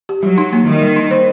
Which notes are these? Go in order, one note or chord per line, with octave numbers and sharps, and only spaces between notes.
G4
F#3 G3
D#4
A#3
D#3 G3
G3
D#4
C5